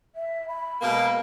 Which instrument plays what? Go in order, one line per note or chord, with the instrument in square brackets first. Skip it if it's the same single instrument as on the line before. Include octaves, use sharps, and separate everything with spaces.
[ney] E5
B5
[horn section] B2 G#3 A#3